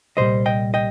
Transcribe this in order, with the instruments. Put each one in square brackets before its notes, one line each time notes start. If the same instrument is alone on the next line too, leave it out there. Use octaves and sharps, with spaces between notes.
[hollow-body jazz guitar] C2 A#2 G3 C5 D#5
D#5 G5
D#5 G5